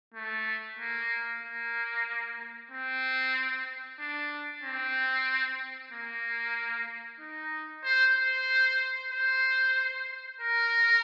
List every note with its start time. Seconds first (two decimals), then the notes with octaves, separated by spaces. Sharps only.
0.14 A3
0.79 A#3
1.43 A#3
2.71 C4
4.00 D4
4.63 C4
5.92 A#3
7.20 D#4
7.84 C5
8.16 C5
9.13 C5
10.41 A#4